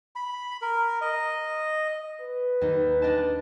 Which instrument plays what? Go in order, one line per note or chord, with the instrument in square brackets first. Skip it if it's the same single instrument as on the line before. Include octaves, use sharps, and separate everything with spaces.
[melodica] B5
A#4
D#5
[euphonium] B4
[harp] D#2 D#4
D4 D#5 A5